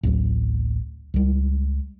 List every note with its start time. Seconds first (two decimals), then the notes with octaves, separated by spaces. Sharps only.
0.03 A1 D2 F#3
1.14 C#2 G3